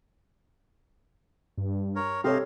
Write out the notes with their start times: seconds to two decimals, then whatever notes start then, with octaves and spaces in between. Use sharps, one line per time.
1.57 G2
1.96 A#4 C#5
2.24 C3 G4 A4 C5 C#5 D#5 F5